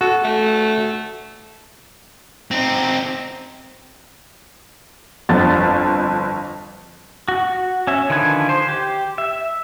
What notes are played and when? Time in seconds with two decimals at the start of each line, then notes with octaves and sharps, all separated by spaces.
0.01 F#4 A4
0.24 A3
2.51 C4 D#4
5.29 G1 F2 A6
7.28 F#4
7.87 C#4 E5
8.10 D3 D#3 F3 B4 G#5
8.49 C5
8.69 G4
9.18 E5